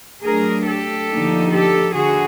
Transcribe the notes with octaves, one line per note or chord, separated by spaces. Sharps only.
F#3 A3 D4 G#4 A#4
G4 A4
D3 F3 A#3 D#4
G4 A4
D3 F#4 G#4